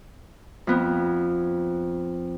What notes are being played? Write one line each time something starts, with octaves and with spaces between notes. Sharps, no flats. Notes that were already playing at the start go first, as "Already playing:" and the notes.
F2 B3 C4